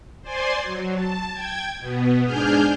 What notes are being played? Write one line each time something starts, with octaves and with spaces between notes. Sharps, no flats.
C5 D5 G#5 C6
F#3
A5
G5 G#6
B2 B3
G#2 D4 G#4 G#5 F6 G6